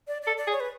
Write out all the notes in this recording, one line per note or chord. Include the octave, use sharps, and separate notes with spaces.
D5
A4 D5
D5
G#4
C#5
B4